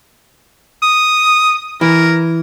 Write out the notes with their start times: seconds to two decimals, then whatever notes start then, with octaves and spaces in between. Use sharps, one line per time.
0.82 D#6
1.81 E3 A#4